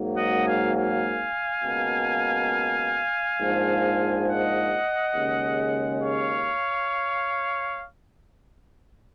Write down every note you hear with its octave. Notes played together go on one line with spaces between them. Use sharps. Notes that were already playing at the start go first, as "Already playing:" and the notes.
Already playing: G#1 G#2 F#3 A#3
D#5 F#5
F5 G#5
F5 G#5
C#2 B2 A#3
A#1 G#2 F3
D#5 F#5
D#2 C#3 G#3
C#5 F5